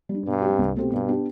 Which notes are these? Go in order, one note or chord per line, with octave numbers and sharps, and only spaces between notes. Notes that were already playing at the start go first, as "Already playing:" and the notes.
G3
D4
G2 B2
G3 C4 G4
C2
B2 A3 C4 G4
G2 B2
B3 D4 G4